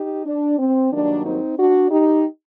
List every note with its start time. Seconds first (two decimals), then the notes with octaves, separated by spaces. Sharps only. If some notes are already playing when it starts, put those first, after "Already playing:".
Already playing: D#4 G4
0.26 D4
0.59 C4
0.92 G2 D#3 F#3 A#3 D4
1.26 C4 D#4
1.58 D4 F#4
1.91 D#4 G4